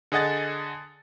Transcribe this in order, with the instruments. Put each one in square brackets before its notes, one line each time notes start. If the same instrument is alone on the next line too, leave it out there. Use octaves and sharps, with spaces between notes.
[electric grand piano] D3 G#4 D#5 F#5 A6